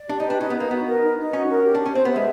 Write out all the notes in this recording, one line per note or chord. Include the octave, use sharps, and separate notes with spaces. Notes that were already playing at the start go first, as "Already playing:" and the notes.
Already playing: D5
D4 G4
D#4
B4
D4
C#4 D#4
B3
A#3 D#4
B3 F#4
A#4
D#4
D#4
C#4 F#4
A#4
G4
D4 G4
C#4
C4 C5
B3
E5
G#3